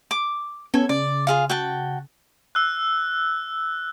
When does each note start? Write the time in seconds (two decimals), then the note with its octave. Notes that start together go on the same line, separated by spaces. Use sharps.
0.11 D6
0.74 B3 C#4 A4 G#6
0.89 C#3 D5
1.27 F4 G#4 F5
1.50 F#4 G5 A5
2.55 E6 F#6